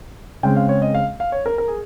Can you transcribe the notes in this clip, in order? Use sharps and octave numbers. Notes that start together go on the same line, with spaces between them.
C#3 G#3 C4 G5
F5
C#5
D#5
F5
F5
C#5
A#4
A#4
G#4